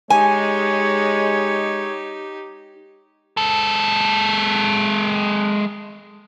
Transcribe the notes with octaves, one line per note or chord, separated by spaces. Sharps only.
G#3 D#4 G4 C#5 G#5
G#3 A4